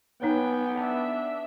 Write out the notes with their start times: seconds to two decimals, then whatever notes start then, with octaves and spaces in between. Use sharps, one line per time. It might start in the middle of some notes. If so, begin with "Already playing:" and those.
0.22 B3 D#4 B4 C#5 G5 G#5
0.77 D4 E5 A5